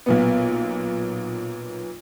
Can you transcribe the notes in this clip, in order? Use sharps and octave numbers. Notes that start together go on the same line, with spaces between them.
B1 A#2 B3